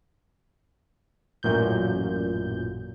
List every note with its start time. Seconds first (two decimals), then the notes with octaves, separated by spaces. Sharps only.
1.43 A1 F#2 A#2 G6